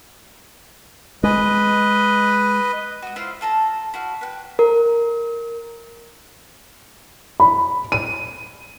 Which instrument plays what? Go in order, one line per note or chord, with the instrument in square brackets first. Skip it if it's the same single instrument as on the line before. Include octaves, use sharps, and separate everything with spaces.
[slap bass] G#3 [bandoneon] B4 D#5
[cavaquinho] F#4 D#6
E4 F4 C5 F5
F4 A4 A5 A#5
E4 F#4 F5
B4 F#5 G5
[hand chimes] A#4
[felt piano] B5
D#7